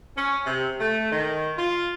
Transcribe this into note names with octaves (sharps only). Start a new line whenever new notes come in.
C#4
C3
A3
D#3
F4